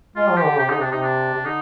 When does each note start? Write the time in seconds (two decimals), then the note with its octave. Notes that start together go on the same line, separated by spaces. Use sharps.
0.16 G#3 F4
0.30 F3
0.37 G4
0.45 D3
0.59 C3 G4
0.70 D3 D#4
0.80 C3 D4
0.92 C3 D#4
1.03 D4
1.34 C3
1.45 D3 D#4